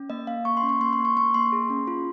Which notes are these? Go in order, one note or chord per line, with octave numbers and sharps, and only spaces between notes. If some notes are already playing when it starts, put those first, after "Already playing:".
Already playing: C#4
A#3 D#5
A#3 F5
A#3 C#6
C6
C#4
C#6
A#3 C6
C6
A#3
C#6
A#3 C#6
A#3 C6
G#4
C#4
F4